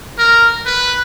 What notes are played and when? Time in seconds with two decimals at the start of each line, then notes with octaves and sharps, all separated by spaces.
0.18 A#4
0.66 B4